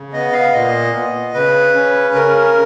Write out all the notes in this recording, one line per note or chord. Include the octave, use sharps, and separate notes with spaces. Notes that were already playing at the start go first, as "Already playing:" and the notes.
Already playing: C#3
B3 D#5
F5
A#2 D#5
B3
C#3 B4
C#4
C#3 A#4